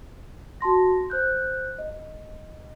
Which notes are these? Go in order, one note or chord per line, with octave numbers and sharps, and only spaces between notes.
F#4 A5 C6 A#6
C5 F#6 G6
D#5